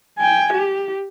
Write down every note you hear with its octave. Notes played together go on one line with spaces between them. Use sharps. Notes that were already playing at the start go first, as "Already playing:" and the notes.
G5 G#5
G4